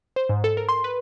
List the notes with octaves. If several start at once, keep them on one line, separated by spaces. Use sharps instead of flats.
C5
G#2
A4
A#4
C6
B4